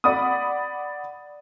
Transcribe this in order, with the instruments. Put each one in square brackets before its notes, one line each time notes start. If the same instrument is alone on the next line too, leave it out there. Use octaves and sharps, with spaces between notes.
[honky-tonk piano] D5 F#5 B5 D#6